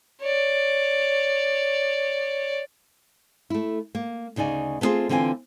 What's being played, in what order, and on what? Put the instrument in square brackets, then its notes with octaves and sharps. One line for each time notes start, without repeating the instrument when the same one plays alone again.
[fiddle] C#5 D5
[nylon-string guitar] A3 E4
A#3
D2 C#3 D#4 D5 G#5
A3 B3 C4 D4 F4 G#4
D3 E3 C4 F4 D#5 G#5